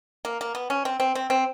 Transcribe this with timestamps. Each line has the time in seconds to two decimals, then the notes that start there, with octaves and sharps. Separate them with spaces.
0.25 A#3
0.41 A#3
0.55 B3
0.70 C#4
0.85 C4
1.00 C4
1.15 C4
1.30 C4